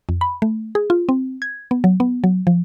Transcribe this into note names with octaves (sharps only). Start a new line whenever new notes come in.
F2
B5
A3
G#4
F4
C4
G#6
B3
F#3
B3
F#3
F3